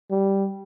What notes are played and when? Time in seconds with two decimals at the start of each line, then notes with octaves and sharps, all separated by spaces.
0.10 G3